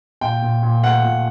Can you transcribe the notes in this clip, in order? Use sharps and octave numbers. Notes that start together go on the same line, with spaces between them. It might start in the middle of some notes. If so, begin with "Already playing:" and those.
A#2 G5
A#2
A#2
A3 F#5
A#2